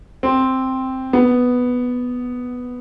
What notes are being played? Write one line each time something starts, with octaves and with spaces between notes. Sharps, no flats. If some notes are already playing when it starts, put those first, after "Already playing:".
C4
B3